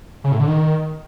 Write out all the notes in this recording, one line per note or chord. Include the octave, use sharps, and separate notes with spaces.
C#3
A2
D3
D#3